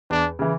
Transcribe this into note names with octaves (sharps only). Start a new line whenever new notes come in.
E2 D4
C#3 E3